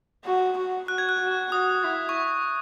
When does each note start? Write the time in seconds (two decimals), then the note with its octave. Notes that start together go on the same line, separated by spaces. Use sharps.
0.24 F#4
0.57 F#4
0.88 F#4 F#6
0.98 G#6
1.09 F#6
1.20 F#4
1.52 F#4 D#6
1.84 E4
2.09 C#6